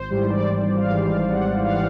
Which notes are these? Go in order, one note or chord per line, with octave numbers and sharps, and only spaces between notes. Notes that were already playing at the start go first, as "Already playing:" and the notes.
Already playing: G#1 C5
G#2 E3 G3 C5
D5
G#1
F5
G#2 E3 G3
F5
G#1 F#5
F5
E3 G3 F#5